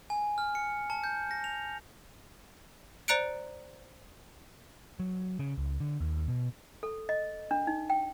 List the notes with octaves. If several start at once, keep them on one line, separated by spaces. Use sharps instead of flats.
G#5
F6
C#7
A5
G6
A#6
F7
C5 D5 A#5 F#6 C#7 D7
F#3
C#3
C#2
D3
D#2
B2
A4
D#5
D4
D#4
G5